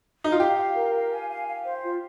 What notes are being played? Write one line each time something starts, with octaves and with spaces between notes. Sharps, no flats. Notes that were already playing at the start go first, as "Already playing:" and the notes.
D#4
F4
G4 F5
F5
A#4
F5
G#5
F5
F5
C5
F4